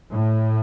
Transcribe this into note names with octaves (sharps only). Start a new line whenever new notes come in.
A2